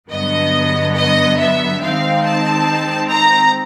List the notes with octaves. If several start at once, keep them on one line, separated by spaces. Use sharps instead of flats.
G2 D3 F#3 B3 D#5
D#5
E5
D#3 G#3 C4 D#4 F5
A5
A#5